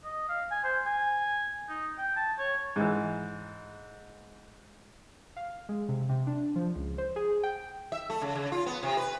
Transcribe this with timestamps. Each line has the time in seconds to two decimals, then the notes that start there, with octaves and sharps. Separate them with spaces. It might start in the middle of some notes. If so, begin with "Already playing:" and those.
0.05 D#5
0.29 F5
0.51 G#5
0.64 C5
0.86 G#5
1.69 D#4
1.98 G5
2.16 A5
2.39 C#5
2.76 G#2 E3
5.36 F5
5.69 G#3
5.89 C3
6.09 C3
6.27 D4
6.56 F3
6.76 C#2
6.98 C5
7.16 G#4
7.43 G5
7.92 E5
8.10 A3
8.22 C#3
8.35 C#3
8.52 F4
8.66 B3
8.83 C3
8.97 B4